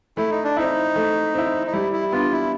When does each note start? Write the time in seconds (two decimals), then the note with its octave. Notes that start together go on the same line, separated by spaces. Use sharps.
0.17 A3 E4
0.30 D#4
0.44 D4
0.57 C4 D#4 E4
0.96 A3
1.34 C4 E4
1.67 D#4
1.73 G3 E4
1.93 E4
2.12 B3 D4 F4
2.32 E4